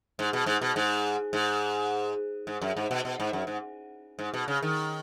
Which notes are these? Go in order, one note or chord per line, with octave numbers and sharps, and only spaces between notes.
G#2
B2
G#2
B2
G#2
G#2
G#2
F#2
G#2
B2
B2
G#2
F#2
G#2
G#2
B2
C#3
D#3